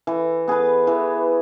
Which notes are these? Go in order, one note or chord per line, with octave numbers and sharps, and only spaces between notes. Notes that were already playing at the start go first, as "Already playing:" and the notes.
E3
B3 G#4 B4
E3